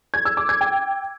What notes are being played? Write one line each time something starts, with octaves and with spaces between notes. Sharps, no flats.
G#6
E6
D6
G#6
G5